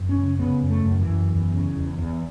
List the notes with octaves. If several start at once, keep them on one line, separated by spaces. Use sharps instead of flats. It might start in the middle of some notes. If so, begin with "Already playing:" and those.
Already playing: F#2
C#4
C#3
C#3 B3
F#2
A3
F#2
E3
F#2
E2
C#3
E2
E2